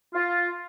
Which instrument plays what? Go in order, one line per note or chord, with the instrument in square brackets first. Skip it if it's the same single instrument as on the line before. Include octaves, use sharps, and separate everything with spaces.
[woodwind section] F4